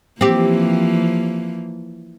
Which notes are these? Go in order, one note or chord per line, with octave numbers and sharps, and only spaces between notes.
E3 F3 A#3 C4 G4